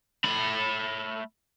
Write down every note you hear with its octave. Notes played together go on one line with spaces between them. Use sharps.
A3 B5